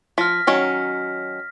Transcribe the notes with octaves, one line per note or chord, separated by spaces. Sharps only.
F3 F6 A#6 B6
D#3 F#3 C#4